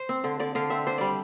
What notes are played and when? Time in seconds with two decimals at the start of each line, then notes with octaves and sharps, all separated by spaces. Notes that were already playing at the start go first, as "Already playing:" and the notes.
Already playing: C5
0.09 C4
0.24 D3
0.40 D3 D5
0.55 D3 F5
0.70 C4 E5
0.87 D4 C5
0.98 G3 D5